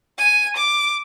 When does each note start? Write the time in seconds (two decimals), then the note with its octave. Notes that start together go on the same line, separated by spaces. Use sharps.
0.18 G#5
0.57 D6